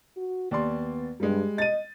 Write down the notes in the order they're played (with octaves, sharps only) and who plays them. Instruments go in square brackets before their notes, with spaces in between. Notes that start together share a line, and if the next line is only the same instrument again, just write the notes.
[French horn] F#4
[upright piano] D#2 D5 C6 [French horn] B3
[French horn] G2 [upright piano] G3 G#3
[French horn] D#5 [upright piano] A6 D#7